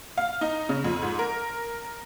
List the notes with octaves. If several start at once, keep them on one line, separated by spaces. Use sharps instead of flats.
F5
D#4
C#3
F2
G#2
A#4